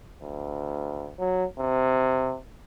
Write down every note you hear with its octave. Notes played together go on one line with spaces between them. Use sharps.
D2
F#3
C3